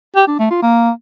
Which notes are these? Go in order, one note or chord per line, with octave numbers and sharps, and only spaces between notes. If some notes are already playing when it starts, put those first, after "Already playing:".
G4
D4
A3
F4
A#3